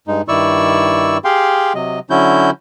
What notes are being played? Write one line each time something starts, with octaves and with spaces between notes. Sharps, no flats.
G2 G#3 D#4
G2 D#3 E4 D5 C#6 E6
G4 G#4 F5 G5 C6
C3 F#3 D#5
D3 F#3 C#4 E4 F#4 G6